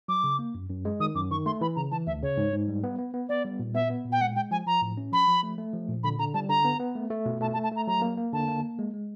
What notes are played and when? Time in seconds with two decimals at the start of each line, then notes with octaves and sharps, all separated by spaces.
0.08 F#3 D6
0.24 C#3
0.39 A#3
0.54 F#2
0.69 F#2
0.85 G#3
1.00 D#3 D#6
1.15 F#2 D6
1.31 D#3 C#6
1.46 A3 C6
1.61 E3 B5
1.76 C#3 A#5
1.91 E3 A5
2.07 D2 E5
2.23 C#3 C#5
2.37 G#2
2.52 G#2
2.68 G3
2.84 B3
2.99 B3
3.14 B3
3.29 B3 D5
3.45 G3
3.59 A#2
3.74 B3 E5
3.90 B3
4.05 A#2
4.12 G5
4.21 G#3 F#5
4.36 G#3 G5
4.51 F3 G#5
4.66 F3 A#5
4.82 A2
4.97 C#4
5.12 F3 B5
5.28 F3
5.43 A3
5.58 A3
5.74 F3
5.89 A#2
6.03 D3 B5
6.19 D3 A#5
6.34 G3 A5
6.49 D3 A#5
6.65 B3
6.80 B3
6.95 A3
7.11 A3
7.26 B2
7.41 A3 A5
7.53 A5
7.56 A3
7.63 A5
7.72 A3 A#5
7.87 F#3 A#5
8.02 A#3
8.17 A#3
8.33 D3 A5
8.48 A#3
8.63 A#3
8.79 G#3
8.94 G#3